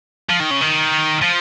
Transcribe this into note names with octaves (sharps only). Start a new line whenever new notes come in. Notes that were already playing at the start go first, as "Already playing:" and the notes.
F3
D#3
C#3
D#3
F3